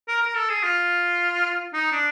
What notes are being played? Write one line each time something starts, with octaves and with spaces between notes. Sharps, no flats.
A#4
A#4
A4
G#4
F4
D#4
D4